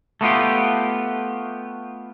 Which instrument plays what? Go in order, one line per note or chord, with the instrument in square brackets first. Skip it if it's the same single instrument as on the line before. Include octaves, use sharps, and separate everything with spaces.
[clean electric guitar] A3 B3 F4 G4